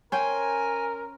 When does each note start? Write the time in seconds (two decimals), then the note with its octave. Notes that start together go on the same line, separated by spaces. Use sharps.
0.12 C#4 A#4 C5 G5 G#5